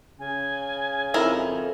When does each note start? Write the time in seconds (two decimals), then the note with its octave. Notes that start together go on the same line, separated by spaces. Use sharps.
0.19 C#3 G#5
1.14 F2 D#4 E4 A#4